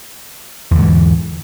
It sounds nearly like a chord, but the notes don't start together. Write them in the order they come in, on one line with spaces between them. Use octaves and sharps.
E2 D3 G#2 E3